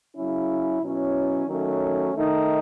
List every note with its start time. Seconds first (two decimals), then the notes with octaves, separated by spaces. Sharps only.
0.15 C#3 F#3 C#4 E4
0.81 B2 F#3 C#4 E4
1.47 D#3 F#3 A3 C#4
2.13 D#3 A3 D#4